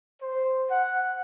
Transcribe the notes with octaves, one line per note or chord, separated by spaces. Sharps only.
C5
F#5